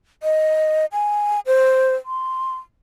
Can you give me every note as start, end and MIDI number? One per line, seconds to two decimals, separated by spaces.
0.23 0.86 75
0.92 1.40 80
1.46 1.95 72
2.06 2.55 84